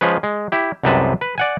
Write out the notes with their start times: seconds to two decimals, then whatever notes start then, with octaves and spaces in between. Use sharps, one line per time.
0.01 F3 G#3 C#4 B4
0.23 G#3
0.52 E4 G4
0.83 C2 F#2 C3 G#3 B4 A5
1.21 B4
1.38 D5 F#5 G#5